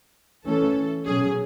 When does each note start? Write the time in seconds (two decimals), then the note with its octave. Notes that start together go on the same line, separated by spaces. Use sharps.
0.46 E3 A3 C#4 A4
1.05 B2 F#3 C#4 G#4